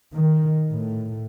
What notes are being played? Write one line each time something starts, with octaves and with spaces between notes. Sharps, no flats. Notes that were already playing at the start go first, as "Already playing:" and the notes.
D#3
A2